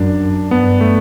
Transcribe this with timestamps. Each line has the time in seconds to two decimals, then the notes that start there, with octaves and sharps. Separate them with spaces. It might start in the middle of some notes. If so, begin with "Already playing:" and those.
Already playing: F#2 D4
0.51 G2 B3
0.81 A3